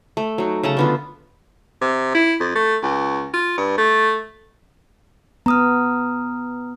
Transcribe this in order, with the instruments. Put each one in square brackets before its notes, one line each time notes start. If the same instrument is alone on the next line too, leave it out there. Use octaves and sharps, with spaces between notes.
[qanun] A3
F#3 D#4
C#3 A3 A5 A#5
D3 B3 F4
[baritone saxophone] C3
E4
F2
A3
C#2
F4
G2
A3
[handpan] B3 [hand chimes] A#5 D#6 F6